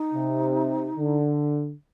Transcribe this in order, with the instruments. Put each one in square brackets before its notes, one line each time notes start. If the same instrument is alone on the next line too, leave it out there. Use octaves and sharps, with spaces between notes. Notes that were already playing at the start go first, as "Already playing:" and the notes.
Already playing: [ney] D#4
[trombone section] C3
D3